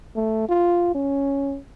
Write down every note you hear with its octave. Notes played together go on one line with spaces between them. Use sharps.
A3
F4
C#4